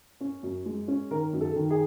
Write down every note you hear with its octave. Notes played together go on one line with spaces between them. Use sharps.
C#4
F#2
G#3
C#4
D#3 A#4
F#2
A4
D#3
G#4